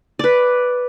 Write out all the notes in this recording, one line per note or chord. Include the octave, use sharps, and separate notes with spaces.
B4 D5